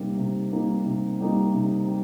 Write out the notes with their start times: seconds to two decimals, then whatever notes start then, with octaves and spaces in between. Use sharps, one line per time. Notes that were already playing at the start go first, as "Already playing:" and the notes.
Already playing: C3 G3 A#3 D#4
0.17 C3
0.52 G3 A#3 D#4
0.86 C3
1.21 G3 A#3 D#4
1.54 C3
1.88 G3